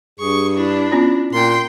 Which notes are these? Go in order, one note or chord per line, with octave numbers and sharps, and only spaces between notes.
G2 G#4 C#6
D4 E4
B3 C#4 F4
A#2 G5 C6